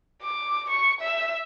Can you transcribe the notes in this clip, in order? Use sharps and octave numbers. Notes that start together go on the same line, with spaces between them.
D6
C#6
E5